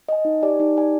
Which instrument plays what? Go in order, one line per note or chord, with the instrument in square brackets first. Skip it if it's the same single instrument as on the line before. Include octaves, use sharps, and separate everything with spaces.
[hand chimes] D#5 G#5
D#4
G4 D5 G#5
D#4
G4 D5 G#5